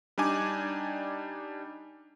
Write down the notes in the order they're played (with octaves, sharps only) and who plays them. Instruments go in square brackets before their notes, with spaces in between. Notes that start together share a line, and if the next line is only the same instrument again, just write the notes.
[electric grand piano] G3 D4 D#4 G#5 D6